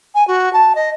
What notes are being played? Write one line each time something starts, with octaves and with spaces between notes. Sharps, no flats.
G#5
F#4
A5
D#5